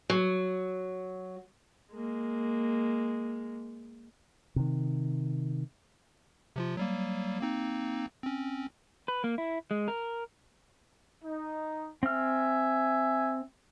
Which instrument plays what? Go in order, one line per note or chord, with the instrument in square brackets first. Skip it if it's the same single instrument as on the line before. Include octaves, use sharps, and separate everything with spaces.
[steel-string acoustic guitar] F#3
[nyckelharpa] G#3 A#3
[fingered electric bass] C3 D#3
[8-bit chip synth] C3 F3 F4
F#3 G3 A#3
A#3 C4 D#4
C4 C#4
[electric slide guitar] B4
A#3
E4
G#3
A#4
[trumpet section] D#4
[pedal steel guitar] C4 F6 [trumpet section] E5 G#5